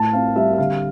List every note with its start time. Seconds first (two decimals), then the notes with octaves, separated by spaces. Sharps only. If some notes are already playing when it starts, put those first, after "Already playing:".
Already playing: A2 A5
0.13 C4 F5
0.36 G3 E5
0.54 E5
0.58 D3 F5